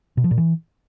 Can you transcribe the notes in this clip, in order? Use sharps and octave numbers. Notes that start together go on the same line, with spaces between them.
B2
F3
A#2
E3